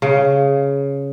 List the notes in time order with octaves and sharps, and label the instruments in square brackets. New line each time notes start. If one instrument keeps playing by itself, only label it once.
[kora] C#3